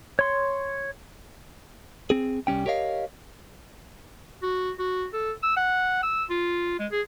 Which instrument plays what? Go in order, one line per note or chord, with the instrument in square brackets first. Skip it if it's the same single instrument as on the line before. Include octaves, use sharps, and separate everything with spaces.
[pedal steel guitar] C#5 C6
[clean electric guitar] C4 G#4
C2 G3 C#4 G5
G4 A#4 C#5 D#5 F5
[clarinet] F#4
F#4
A4
E6
F#5
E6
F4
G#3
G#4